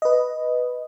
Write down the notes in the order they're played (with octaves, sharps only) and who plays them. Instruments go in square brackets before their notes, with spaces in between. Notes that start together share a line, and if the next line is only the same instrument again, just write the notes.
[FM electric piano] B4 D#5